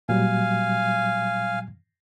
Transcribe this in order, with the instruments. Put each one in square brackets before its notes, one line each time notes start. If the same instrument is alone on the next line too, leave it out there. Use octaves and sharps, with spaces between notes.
[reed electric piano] A#2 F#3 G3 [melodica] F5 G#5